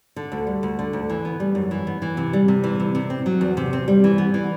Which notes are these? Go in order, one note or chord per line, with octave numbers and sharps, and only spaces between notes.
D3
D2
G3
D2
D3
D2
E3
B3
G3
F#2
E3
B3
E3
C3
G3
C3
E3
C3
C3
C4
F#3
E2
C3
C4
G3
E3
B3
E3